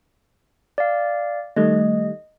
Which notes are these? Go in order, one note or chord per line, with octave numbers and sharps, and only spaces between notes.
D5 F5
D#3 G3 A3 D#5